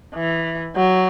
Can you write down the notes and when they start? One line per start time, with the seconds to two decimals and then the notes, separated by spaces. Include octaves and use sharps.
0.14 E3
0.76 F#3